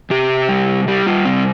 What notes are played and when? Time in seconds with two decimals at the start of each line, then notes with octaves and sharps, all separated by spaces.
0.10 C3 G4
0.49 G3
0.88 G3 G4
1.07 F4
1.25 C3 C4